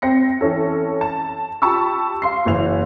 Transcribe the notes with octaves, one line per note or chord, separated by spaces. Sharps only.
C4 A#6 C#7
E3 C#4 A4
A5
F4 G4 A5 B5 C#6 E6
F5 C6 C7
F#1 E3 F7